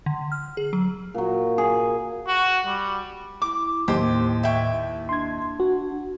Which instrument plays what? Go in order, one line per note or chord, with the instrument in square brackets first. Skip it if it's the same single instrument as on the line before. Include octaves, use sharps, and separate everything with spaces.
[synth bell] D3
F6
G#4
F#3
[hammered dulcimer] A#2 F#3
G#4
[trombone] F#4
G3
[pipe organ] E4 [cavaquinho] D6
[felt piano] D#2 [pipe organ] A2 [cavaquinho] G4 C5 C6
[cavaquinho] E4 G5 C#6
[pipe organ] D4 [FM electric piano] C6 G#6
[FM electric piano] F#4